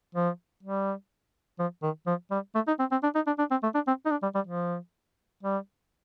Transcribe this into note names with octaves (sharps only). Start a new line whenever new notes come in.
F3
G3
F3
D#3
F3
G3
A3
D#4
C4
C4
D4
D#4
D4
D4
C4
A3
D4
C4
D#4
D4
G3
G3
F3
G3